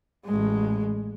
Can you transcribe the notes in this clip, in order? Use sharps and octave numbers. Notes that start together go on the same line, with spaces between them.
A1 G#3